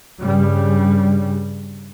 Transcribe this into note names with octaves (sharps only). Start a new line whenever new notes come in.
G2 C#3 G3